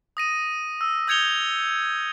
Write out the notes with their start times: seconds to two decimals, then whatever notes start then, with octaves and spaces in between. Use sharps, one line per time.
0.17 D#6 A#6 D#7
0.81 E6
1.08 D#6 G6 G#6 C#7 F7 G7